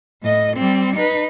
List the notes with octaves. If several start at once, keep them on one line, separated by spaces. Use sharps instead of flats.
A2 D#5
G3 C4
D#4 B4